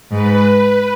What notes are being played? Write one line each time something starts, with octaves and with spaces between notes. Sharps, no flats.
G#2 B4